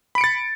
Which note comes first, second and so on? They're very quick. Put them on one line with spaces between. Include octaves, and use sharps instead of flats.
B5 D7 C#7 A6